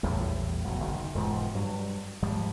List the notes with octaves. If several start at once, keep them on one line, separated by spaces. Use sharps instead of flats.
A#1 E2 A2 G3
E1 B2 F#3
F#1 D#3
E1 G#2 F3
G2 F#3
G#2 F3 G3